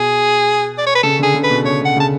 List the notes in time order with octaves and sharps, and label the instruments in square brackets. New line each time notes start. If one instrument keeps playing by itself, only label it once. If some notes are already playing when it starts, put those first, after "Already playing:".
Already playing: [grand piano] B2 [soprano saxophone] G#4
[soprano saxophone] D5
C#5
B4
[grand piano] C#3 [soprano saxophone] A4
[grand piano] D3 [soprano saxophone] G#4
[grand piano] C#3
[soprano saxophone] B4
[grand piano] B2
[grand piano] C#3 [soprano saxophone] C#5
[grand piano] B2 [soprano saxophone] F#5
[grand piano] C#3 [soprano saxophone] A5